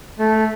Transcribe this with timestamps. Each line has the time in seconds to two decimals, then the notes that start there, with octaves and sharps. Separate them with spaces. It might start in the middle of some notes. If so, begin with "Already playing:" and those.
0.19 A3